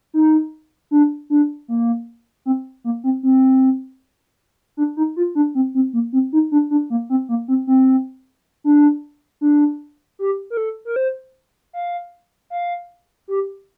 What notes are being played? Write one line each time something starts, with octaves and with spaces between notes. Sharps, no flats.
D#4
D4
D4
A#3
C4
A#3
C4
C4
D4
D#4
F4
D4
C4
C4
A#3
C4
D#4
D4
D4
A#3
C4
A#3
C4
C4
D4
D4
G4
A#4
A4
A#4
C5
F5
F5
G4